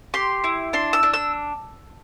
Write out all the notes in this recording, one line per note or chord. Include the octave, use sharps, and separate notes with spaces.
G4 C6
E4
D4 C6
E6
D4
E6